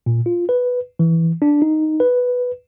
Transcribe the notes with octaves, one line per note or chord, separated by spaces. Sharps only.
A#2
F4
B4
E3
D4
D#4
B4